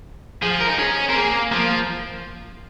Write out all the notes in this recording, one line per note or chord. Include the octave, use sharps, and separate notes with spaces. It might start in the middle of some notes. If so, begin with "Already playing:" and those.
F3 G#4
A#4
D#4
C#4 G#4
C4 A#4
A#3 G#4
F3 A#3